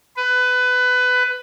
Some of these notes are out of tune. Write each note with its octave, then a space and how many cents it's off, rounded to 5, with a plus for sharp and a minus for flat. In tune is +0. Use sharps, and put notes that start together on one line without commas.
B4 +20